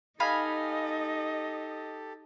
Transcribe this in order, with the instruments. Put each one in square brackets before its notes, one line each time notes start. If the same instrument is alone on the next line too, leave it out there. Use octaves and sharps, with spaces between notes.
[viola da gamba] D#4 [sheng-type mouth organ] G4 A4 [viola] D#5 [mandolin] F5 G#5 B5